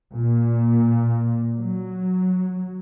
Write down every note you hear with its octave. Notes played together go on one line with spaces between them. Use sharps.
A#2
F#3